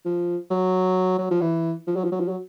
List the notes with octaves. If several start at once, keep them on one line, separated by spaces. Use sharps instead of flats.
F3
F#3
F#3
F3
E3
F3
F#3
F3
F#3
F3
F#3